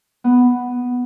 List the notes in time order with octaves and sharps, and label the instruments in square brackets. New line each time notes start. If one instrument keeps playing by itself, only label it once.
[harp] B3